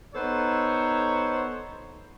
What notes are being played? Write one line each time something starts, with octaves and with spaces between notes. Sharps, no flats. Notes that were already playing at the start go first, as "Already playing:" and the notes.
B3 D#4 A4 C5 C#5